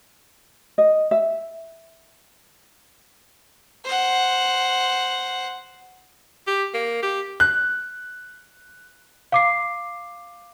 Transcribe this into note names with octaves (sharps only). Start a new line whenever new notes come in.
D#5
E5
C5 F#5
G4
A#3
G4
F#6
F5 D6 C7